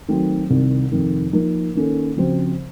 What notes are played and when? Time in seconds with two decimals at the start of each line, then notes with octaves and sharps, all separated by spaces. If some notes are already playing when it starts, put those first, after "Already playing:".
0.08 D#3 F#3 A3 C4 F#4
0.50 C2 C3 D#3
0.92 F2 C3 D#3
1.33 F3 A#3 D#4 A#4
1.75 D#3 A#3 C#4 A4
2.16 C#3 F3 C4 F#4 C5